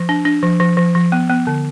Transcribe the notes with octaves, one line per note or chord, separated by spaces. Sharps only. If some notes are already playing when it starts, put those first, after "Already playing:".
Already playing: F3
D4
D4
F3
F3
F3
F3
B3
B3
D3